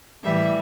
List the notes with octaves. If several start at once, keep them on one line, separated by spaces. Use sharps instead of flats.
A2 E3 G3 E5